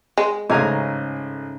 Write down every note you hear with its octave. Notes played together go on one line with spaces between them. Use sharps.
G#3
A1 G#2 C#3 G#5 A#5